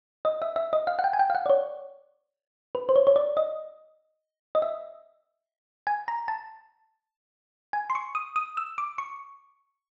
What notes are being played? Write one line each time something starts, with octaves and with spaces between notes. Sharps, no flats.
D#5
E5
E5
D#5
F5
F#5
G5
G#5
G5
F5
F#5
D5
C#5
B4
C5
C#5
C#5
D5
D#5
D#5
E5
G#5
A#5
A5
G#5
C6
C#6
D#6
D#6
E6
D6
C#6